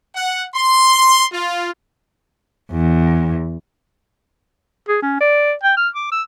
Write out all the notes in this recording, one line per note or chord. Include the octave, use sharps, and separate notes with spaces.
F#5
C6
F4
E2
G#4
C#4
D5
G5
F6
D6
E6